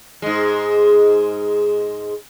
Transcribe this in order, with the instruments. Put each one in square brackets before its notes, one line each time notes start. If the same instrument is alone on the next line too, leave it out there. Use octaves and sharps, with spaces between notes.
[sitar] G#2 G#3